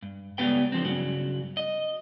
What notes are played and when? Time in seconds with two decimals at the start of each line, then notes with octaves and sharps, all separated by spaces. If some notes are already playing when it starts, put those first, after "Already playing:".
0.02 G2
0.38 C#2 C#3 G3 B3 B4 G5
0.72 D3 F3 C4
0.85 G2 C#3 F#3
1.57 D#5